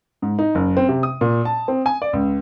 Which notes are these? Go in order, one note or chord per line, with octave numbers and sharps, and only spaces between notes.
G#2
D#4
F#1
C4
C3
D#6
A#2
A5
C4
G#5
D5
C#2